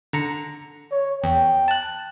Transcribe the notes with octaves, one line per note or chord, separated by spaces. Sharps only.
D3 A#5 C#7
C#5
E2 G5
A5 F#6